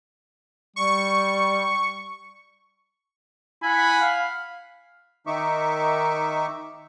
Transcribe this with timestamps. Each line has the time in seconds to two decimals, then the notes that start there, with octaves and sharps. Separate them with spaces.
0.76 G3 C#6
3.63 E4 F#5 G#5 B5
4.01 F5
5.27 D#3 D#4 E5 C#6 D6